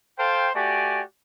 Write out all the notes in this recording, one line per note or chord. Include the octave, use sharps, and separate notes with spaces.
A4 C5 F5 G5
A3 F#4 G4 D5 G#5